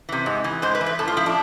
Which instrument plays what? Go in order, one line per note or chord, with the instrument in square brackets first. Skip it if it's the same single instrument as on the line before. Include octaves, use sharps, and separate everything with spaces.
[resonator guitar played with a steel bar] C3 E3
G#2
E3
G#2 C5
B4
E3
B4
A2 A4
F4
F3 E4
D4